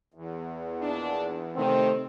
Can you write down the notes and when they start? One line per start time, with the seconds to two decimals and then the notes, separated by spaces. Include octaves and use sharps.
0.14 E2
0.80 A#2 D#3 D4
1.56 C3 D#3 A3 C4